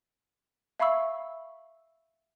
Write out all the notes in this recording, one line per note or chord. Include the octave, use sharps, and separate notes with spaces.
E5 F5 B5 C#6 E6